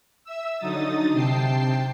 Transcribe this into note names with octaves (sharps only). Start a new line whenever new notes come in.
E5 E6
D3 F#3 D#4 D#6 A6
C3 G5 A5 C7